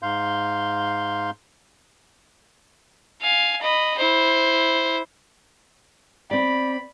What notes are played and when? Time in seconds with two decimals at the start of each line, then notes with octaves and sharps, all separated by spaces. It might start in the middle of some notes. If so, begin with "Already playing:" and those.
0.02 G#2 F5 C6 G6
3.22 F5 G#5
3.62 D#5 B5
3.98 E4 C5
6.31 C4 D5 B5